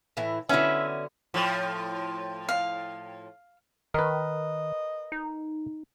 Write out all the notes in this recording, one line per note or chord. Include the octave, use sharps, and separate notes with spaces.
A2 E3 E4
D3 F#3 B3 C#4 E4 E5
A2 F3
F5
D#3 A#4 B4 D#5
D#4